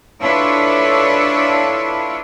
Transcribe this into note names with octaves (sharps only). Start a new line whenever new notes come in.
D4 E4 F4 A4 B4 C#5